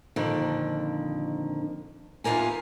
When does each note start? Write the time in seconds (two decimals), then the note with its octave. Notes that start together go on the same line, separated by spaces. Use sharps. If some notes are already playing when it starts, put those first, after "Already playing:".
0.16 F2 A#2 D3 D#3
2.24 E2 E3 F4 G4 A#4 G#5